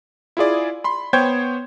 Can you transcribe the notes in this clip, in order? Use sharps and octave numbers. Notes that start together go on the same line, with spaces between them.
E4 F4 G#4 D5
B5 C6
B3 C5 C#5 G5 G6 G#6